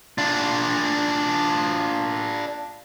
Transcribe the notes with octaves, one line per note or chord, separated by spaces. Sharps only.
D4 F4